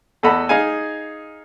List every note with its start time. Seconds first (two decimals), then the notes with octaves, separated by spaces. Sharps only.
0.23 E2 A4 D#5 F#5 B5
0.49 D#4 G#4 F5 G#5